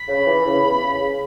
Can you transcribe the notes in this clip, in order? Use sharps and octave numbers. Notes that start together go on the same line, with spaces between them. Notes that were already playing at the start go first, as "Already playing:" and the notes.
Already playing: B5
C#3
E3
C#3
E2
C#3
C#3